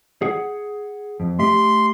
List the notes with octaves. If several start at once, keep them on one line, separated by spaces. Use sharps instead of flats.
G#4 F#5
F2
A3 G4 E5 C6